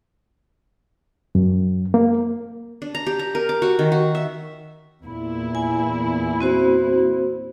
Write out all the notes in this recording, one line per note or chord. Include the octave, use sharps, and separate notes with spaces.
F#2
A#3
D4
A#5
G4
A#5
A#4
D6
F#4
D#3
F#4
E5
E2 A#2 E4
G#5
C4 F#4 C5